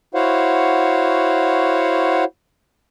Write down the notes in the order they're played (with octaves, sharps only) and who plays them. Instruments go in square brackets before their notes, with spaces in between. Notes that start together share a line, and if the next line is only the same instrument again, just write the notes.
[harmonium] E4 F#4 C5 C#5 F5 F#5